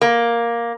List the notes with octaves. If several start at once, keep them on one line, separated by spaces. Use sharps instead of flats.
A#3